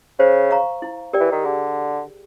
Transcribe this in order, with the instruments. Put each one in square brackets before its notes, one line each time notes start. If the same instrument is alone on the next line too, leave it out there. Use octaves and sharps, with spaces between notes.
[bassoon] C#3 [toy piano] C5
[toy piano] F5 A#5 C#6
E4
G4 A#4 D5 G5
[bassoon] E3
D#3
[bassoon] D3 [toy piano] G#4